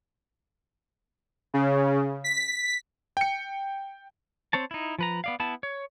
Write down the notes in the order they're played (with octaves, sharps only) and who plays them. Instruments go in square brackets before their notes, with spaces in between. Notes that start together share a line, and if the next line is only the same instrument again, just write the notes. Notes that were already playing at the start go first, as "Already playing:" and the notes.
[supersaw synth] C#3
B6
[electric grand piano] G5 C#7
[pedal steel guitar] C4 C5 C#5 A5
D#4 E4
F3 B4 A#5
B3 D5 F5
B3 E4 A5
C#5